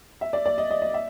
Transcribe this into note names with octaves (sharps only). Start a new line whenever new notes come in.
E5
D5
D5
D#5
D#5
D#5
E5